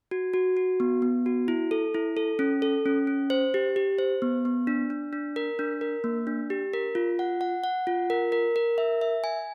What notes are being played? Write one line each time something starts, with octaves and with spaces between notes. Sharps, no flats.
F#4
F#4
F#4
B3
B3
F#4
E4
A4
E4
A4
C#4
A4
C#4
C#4
C5
G4
G4
C5
B3
B3
D4
D4
D4
A#4
D4
A#4
A#3
D4
G4
A#4
F4
F#5
F#5
F#5
F4
A#4
A#4
A#4
E5
E5
G#5